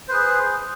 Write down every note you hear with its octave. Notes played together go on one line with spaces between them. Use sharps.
G#4 B4 C5